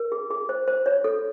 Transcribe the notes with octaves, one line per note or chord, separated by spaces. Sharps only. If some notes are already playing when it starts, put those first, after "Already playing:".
Already playing: A#4
G#4
G#4
C5
C5
C#5
A4